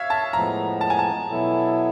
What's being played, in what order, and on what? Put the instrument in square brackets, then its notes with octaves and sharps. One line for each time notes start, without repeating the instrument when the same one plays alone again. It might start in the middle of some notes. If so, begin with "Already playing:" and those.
Already playing: [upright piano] C#5 E5 F5
A5
[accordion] A2 F3 G#3 B3 [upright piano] A#5
[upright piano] A5
G#5
A5
[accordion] B2 F#3 B3 E4 A4